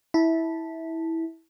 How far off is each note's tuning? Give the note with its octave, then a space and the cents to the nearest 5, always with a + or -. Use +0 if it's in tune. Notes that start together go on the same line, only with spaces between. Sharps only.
E4 -15 A5 +0